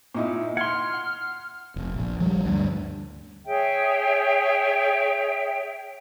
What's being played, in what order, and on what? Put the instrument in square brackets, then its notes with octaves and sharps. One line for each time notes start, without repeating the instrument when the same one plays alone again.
[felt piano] A#2 D#4 E4
[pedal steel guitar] F#5 C6 [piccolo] F6 [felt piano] G#6
[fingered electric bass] F1
A#1
F3 G3
D2 G2
[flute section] G#4 C#5 E5 G5